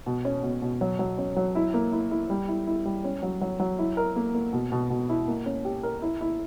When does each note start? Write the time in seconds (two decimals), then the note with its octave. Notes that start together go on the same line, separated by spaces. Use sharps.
0.06 B2
0.25 C#4
0.43 B2
0.62 B2
0.81 F#3
0.99 F#3
1.18 C#4
1.36 F#3
1.55 E4
1.74 A#3
1.92 E4
2.11 E4
2.30 G3
2.48 E4
2.67 E4
2.85 G3
3.04 C#4
3.23 F#3
3.41 F#3
3.60 F#3
3.79 E4
3.97 A#4
4.16 A#3
4.34 A#3
4.53 B2
4.72 B2
4.90 B2
5.09 E4
5.28 A#3
5.46 C#4
5.65 G4
5.83 A#4
6.02 E4
6.21 E4